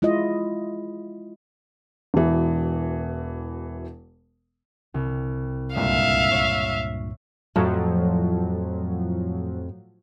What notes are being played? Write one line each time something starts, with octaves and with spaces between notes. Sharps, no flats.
G#3 E4 F4 D#5
E1 B2 E3
C2
C#2 G2 A#2 G#3 E5 F5
C#5
F2 A2 F3 F#3